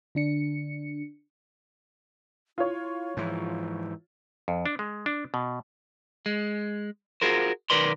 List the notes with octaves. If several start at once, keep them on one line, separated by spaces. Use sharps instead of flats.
D3 D4 C#7
E4 F4 C#5
G#2 E3 F3
F2
D4
G#3
D4
B2
G#3
F4 F#4 G#4 A#4 C5
B1 D#3 A#4 B4 D5 C6